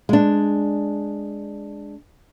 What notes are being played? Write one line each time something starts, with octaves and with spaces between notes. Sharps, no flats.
G#3 D4